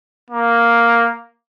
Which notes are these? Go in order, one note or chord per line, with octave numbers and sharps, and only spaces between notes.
A#3